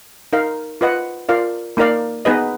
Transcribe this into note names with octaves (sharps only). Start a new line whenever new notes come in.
D#4 A#4 F5
F4 B4 D#5 F#5
F4 A#4 D5 F5
A#3 D#4 A#4 D5 F5
B3 D#4 G#4 B4 D#5